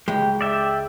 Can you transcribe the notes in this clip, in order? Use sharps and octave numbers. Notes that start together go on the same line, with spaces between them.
C#2 G#3 G4
D5 E5 G5